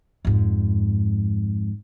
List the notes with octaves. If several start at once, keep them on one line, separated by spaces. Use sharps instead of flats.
F2 G#2